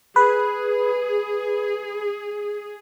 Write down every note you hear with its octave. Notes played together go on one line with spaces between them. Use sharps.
G#4 B4